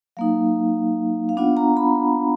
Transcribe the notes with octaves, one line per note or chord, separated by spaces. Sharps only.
F#3 A#3 D#4 F5
F5
B3 D4 F4 F#5
A#5
B5